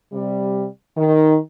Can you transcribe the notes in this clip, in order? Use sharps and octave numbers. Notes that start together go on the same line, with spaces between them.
C3 G3
D#3